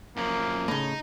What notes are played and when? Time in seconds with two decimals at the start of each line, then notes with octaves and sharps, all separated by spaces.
0.17 F#2 F3 A#3
0.68 A2 C#3 D#4